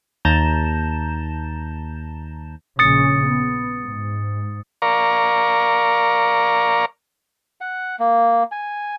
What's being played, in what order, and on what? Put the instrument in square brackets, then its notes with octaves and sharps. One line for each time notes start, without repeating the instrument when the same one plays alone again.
[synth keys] D#2 A5 A#5 G6 E7
[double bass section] A#1 C#3 C#4 [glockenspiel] D#6 A6 C#7
[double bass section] B3
G#2
[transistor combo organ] A#4 D5 F5 A#5 C#6
[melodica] F#5
A#3
G#5